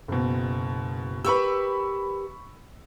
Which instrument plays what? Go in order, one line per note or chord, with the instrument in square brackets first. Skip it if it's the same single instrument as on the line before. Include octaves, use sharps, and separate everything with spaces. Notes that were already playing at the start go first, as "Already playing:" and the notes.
[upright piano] F#1 B2
[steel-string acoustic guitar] G4 A#4 B4 [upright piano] B5 C#6 E6